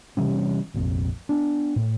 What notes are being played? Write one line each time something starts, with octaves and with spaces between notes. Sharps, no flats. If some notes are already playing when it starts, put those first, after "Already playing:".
C3 E3 G3 C#4
F1 A#1 F2
B3 D4
A2